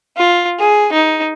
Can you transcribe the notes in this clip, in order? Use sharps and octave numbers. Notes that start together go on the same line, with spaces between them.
F4
G#4
D#4